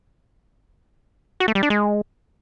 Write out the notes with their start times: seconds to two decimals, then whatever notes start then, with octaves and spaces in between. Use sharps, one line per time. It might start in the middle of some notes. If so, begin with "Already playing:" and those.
1.40 F#4
1.48 A3
1.55 G3
1.63 D4
1.70 G#3